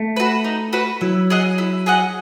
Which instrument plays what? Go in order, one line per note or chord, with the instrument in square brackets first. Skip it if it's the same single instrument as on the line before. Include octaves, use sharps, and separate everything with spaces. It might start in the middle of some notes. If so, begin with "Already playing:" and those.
Already playing: [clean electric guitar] A3
[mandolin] F#4 B4
D#4
F#4 B4
[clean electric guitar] F#3 [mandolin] E4
[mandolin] G#4 D#5 F#5
E4
G#4 D#5 F#5